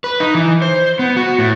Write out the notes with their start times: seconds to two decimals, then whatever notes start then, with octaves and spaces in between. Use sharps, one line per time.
0.04 B4
0.20 D#4
0.35 E3
0.62 C5
0.99 B3
1.16 F#4
1.38 A2